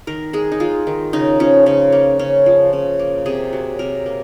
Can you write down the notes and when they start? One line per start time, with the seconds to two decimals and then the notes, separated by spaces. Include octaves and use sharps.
0.07 D#3 A#4
0.33 G#3 G#4
0.52 D#4
0.60 G#3 F4
0.87 D#3
1.13 C#3 D#4
1.40 F3 C#4
1.66 C#3 C#4
1.92 A#3
2.19 C#3 C#4
2.46 F3
2.73 C#3
2.99 A#3
3.26 C3 G#4
3.53 F#3
3.79 C3 A#4
4.06 A#3